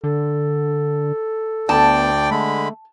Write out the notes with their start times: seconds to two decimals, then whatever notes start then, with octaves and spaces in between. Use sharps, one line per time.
0.04 D3 A4
1.69 D2 B3 D5 G5 A5
2.31 D3 G#3 A3 B5